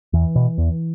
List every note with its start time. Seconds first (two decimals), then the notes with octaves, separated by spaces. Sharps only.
0.13 E2 E3
0.36 B2
0.58 E2